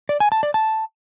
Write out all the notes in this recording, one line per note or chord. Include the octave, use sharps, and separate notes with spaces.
D5
G#5
A5
D5
A5